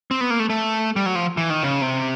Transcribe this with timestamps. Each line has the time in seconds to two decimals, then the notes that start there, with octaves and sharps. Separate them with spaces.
0.11 C4
0.21 B3
0.30 A#3
0.40 A3
0.50 A3
0.96 G3
1.06 F#3
1.15 F3
1.37 E3
1.50 D#3
1.63 C#3
1.81 C3